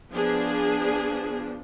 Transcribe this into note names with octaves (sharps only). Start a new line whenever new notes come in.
F3 B3 D4 G#4